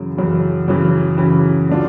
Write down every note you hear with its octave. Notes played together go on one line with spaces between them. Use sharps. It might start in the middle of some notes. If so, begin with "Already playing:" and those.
Already playing: F#2 C#3 E3
F#2 C#3 E3
F#2 C#3 E3
F#2 C#3 E3
D3 F#3 A3 D4 F4